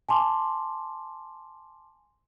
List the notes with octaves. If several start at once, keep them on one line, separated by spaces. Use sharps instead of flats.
G#5 A5 C6 D6